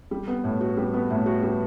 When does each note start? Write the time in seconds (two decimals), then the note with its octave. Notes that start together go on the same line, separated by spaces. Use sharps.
0.11 G3
0.28 B3
0.44 A2
0.61 F#4
0.77 G3
0.93 B3
1.10 A2
1.26 F#4
1.42 G3